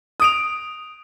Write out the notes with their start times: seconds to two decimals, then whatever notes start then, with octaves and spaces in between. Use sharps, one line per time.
0.20 D#6 D7 F7